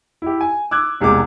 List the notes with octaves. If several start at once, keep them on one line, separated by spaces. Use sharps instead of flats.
E4 G4
G#5
D6 E6 F#6 G#6
E1 C2 C3 G#3 D6